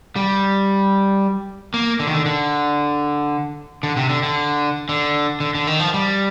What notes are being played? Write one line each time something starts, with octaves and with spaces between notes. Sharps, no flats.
G3
A#3
D3
D#3
D3
D3
D3
C3
D3
D3
D3
D3
D3
D#3
F3
G3